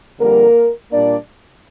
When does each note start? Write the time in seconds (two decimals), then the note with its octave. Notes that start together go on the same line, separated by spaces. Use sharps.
0.19 F2 D3 G3 A#3 A#4
0.91 A#2 G3 A#3 D4 D5